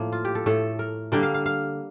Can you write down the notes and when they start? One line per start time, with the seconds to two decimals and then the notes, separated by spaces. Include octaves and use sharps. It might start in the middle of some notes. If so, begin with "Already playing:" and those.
Already playing: A2 F3 A#3
0.12 F4
0.25 G4
0.35 A4
0.46 A2 A3 A4
0.79 A#4
1.12 D3 G3 A#3 G5
1.23 F5
1.34 F5
1.46 F5